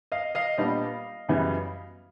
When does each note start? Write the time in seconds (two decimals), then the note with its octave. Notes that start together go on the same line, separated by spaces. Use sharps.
0.12 D#5 F5
0.35 D#5 F5
0.58 A#2 G3 B3 D4 D#5 F5
1.29 F#2 C#3 E3 G3 B3